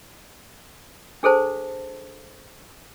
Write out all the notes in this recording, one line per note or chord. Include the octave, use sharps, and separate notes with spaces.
D4 G#4 A4 C5 A5